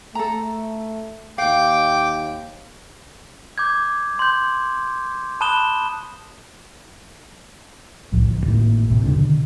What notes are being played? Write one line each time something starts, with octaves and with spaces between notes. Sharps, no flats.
A3 A4 A#5
D#2 F5 G5 D6
D6 G6 G#6
C6 G6
A5 B5 D#6 F#6 E7 G7
D#1 C2 A2 F3
D1
G#1 A2 A#3
G#1 A2 C3
D#1 C#3 D4
B2 D3 D#3